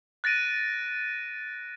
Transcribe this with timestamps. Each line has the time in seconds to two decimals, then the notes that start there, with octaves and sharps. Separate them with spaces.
0.24 F#6 A6 A#6 D7 D#7